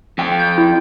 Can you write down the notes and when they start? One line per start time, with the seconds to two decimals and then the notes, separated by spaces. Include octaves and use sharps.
0.18 F2 G5
0.38 G6
0.58 E4